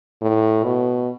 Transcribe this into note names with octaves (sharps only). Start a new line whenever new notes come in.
A2
B2